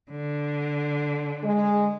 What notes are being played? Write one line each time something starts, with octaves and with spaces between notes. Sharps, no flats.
D3
G#3